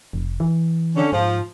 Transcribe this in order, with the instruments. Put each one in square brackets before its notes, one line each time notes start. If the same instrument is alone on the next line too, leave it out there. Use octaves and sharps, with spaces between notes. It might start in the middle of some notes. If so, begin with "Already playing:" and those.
[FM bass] F1
E3
[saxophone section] D3 C#4
[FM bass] G#2 [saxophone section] F3